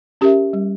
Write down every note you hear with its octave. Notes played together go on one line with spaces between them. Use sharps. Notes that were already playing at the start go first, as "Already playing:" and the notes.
C#4 G4 A#4 E5
G3